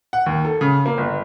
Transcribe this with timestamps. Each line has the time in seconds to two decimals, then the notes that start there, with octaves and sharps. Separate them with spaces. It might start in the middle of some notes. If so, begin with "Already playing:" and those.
0.13 F#5
0.26 D#2
0.45 A4
0.61 C#3
0.86 A#3
0.98 G1